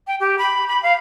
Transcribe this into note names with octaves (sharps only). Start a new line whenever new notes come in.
G5
G4
B5
B5
F5